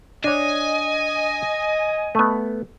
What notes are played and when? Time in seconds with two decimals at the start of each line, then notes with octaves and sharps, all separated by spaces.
0.24 D4 C#5 D#5 G#5
2.15 A3 B3